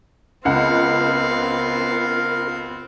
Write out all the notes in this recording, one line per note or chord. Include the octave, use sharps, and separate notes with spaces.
C#2 B3 C4 F4 A#4 F5 F#5